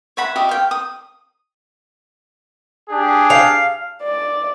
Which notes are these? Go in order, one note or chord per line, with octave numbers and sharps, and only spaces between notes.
C#5 E5 F#5 B5
F#4 G4 D#5 E5
F5 G5
D#6
D4 G4 G#4
F5
D5